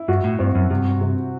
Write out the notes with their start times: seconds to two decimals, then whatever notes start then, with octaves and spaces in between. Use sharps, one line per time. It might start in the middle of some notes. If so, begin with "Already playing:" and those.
Already playing: E4
0.08 G2 F#4
0.24 A2
0.39 G2 C4
0.55 F#2
0.70 G2 C3
1.01 C3